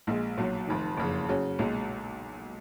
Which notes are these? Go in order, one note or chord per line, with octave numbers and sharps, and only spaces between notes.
A#1 A#2 G#3
B1 A#2 F#3
F1 F2 D#3
F#1 F2 C#3
C#3 F#3 C#4
B1 A#2 G#3